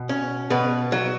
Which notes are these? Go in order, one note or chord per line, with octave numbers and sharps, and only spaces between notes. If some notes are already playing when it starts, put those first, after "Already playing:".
Already playing: B2
C#4
B2 B4
F#3